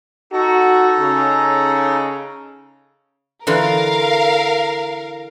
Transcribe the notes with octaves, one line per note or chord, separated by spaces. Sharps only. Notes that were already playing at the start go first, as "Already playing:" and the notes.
D#4 F#4 A4 A#5
C#3
D3 E3 F4 A#4 F5